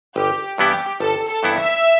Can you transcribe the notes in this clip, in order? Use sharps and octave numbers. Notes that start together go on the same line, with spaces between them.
G1 G4
G2 E3 B3 E4 G4
G1 A4
A4
G2 E3 B3 E4
E5